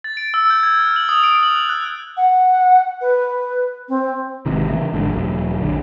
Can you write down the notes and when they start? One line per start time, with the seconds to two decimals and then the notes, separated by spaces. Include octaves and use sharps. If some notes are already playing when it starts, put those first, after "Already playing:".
0.04 A6
0.17 D7
0.34 E6
0.50 G6
0.63 G#6
0.79 F6
0.96 F#7
1.09 D#6
1.23 D7
1.43 F#7
1.55 F#6
1.69 F#6
2.17 F#5
3.01 B4
3.89 C4
4.46 G#1 G#2 C3 D#3
4.68 C#3 E3 G#3
4.93 G#1 G#2 D3
5.10 E1 F#2
5.61 A#1 D3